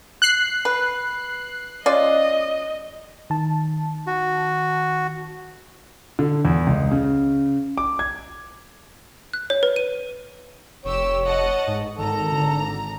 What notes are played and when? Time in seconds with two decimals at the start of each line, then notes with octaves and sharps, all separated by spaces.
0.22 F#6 C7
0.65 B4
1.86 C#4 F4 D5 D#5
3.30 D#3 A5
4.07 F#4
6.19 D3
6.45 E2
6.67 C#2
6.92 C#3
7.78 D6
7.99 G#6
9.34 F#6
9.50 C#5
9.63 B4
9.76 D#7
10.85 F1 G4 C#5 E6
11.26 D#5 F#5 A5
11.67 G#2
11.98 G#1 D#3 A4 A#5
12.32 D3